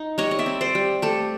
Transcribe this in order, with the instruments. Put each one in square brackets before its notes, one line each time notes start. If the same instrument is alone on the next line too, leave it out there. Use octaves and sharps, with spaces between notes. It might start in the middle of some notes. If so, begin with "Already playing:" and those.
Already playing: [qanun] D#4
G3 C#5 D#5
D#5
D5 E5
C4
C5 D5
G3
A3 G4 A4